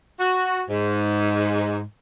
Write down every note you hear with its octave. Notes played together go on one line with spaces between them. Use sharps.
F#4
G#2